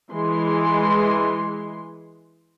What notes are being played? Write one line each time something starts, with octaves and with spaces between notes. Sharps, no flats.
E3 G#3 C6